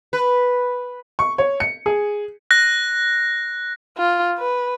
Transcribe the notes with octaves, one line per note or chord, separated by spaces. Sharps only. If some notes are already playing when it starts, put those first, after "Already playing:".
B4
C#6
C#5
C#7
G#4
F#6 A#6
F4
B4